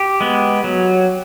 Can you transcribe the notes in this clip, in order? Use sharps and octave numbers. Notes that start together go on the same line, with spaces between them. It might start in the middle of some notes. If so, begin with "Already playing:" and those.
Already playing: G4
G#3 B3
F#3